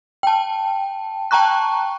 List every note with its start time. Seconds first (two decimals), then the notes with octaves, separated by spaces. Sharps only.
0.23 G5 A5
1.31 G5 A5 A#5 C#6 F#6